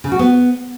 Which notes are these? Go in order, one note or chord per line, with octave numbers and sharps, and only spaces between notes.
C#3
F#4
B3